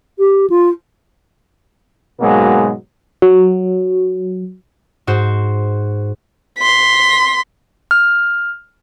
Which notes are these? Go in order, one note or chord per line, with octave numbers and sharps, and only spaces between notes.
G4
F4
G#2 B2 F#3 G#3 A#3
F#3
G#2 F#4 C5
C6 B6
F6